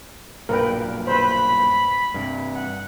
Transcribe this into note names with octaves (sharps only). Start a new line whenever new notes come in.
B1 G2 A#2 A#4 B4 G5
B4 C5 B5
G2 C3
F#5